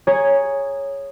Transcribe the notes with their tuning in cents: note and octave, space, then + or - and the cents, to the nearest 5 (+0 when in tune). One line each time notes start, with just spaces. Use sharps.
G#4 -10 C#5 +0 A#5 +0